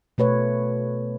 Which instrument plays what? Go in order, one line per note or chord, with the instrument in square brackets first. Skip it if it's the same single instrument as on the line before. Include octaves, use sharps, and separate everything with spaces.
[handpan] B2 A3 B4 C#5